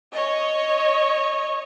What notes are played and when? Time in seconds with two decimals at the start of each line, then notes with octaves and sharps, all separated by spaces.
0.13 C#5 D#5